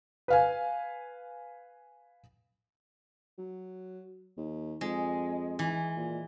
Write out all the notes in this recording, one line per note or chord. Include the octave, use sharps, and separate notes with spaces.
B4 F5 G#5
F#3
D#2
F2 G#3
E3
A#2